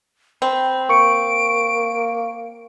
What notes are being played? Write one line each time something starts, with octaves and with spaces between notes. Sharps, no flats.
C4 B5
A#3 C#6 C#7 D7